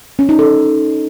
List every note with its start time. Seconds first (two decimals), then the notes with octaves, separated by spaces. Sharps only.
0.19 C#4
0.29 D#4
0.39 A4